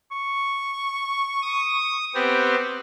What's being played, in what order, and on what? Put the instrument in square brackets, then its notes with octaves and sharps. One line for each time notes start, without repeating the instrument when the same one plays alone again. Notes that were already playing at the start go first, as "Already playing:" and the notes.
[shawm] C#6
[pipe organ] D#6
B3 C4 G4